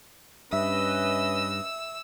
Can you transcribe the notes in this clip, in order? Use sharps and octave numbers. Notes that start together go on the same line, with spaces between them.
G2 C#4 B4 D#5 E5 E6